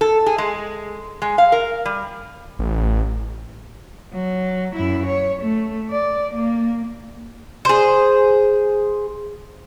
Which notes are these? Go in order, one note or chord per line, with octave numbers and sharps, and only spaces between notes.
A4
G#4
G#3
G#3
F5
A#4
G3
A1
F#3
F#2 E4
C#5
A3
D5
A#3
G#4 C5